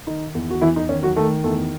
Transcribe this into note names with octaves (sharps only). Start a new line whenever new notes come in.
D#3 D#4
E2
F#4
E2 E3 E4
D#4
D#3 C#4
F#3 F#4
D#3 A3 A4
E2 A3 A4